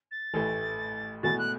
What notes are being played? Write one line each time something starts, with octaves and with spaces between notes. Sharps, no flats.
A6
A1 A2 E3 A3
E1 E2 B2 A3 F#4 A6
F#6